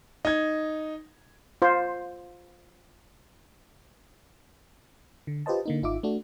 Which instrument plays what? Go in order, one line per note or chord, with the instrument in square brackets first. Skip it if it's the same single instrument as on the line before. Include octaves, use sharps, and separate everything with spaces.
[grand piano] D#4 G#6
[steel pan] F4 C5
[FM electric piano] D3
F4 G4 B4 C5 D#5 A5
D3 A#3 D#4
G#1 D#4 F4 E5 D6
A3 D4 F#4